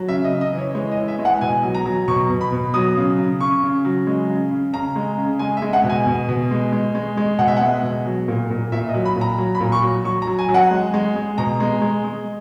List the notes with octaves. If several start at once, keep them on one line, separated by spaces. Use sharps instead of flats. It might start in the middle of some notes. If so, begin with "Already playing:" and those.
Already playing: F#3
C#3 E5
D#5
C#3
D#5
E3
C#5
G#3 C#5
D#5
E3
E5
G#3
F#5
B2 G#5
F#3
A#5
F#3
B2 C#6
B2
B5
B2
F#3 D#6
C#3
C#3
C#3 C#6
C#3
F#3
G#3
C#3
C#3
C#3 A#5
G#3
C#3
G#3 G#5
E5
G#3
F#5
B2
G#5
B2
B2
G#3
G#3
G#3
G#3
B2 F#5
E5
G#3 F#5
B2
F#3
A#2
A#2
A#2 E5
D#5
F#3
B5
A#2
A#5
F#3
B5
A#2
C#6
F#3
F#3 C#6
A#5
F#3
G#5
F#3
F#5
G#3
G#3
G#3
B2 A#5
G#3
G#3
G#3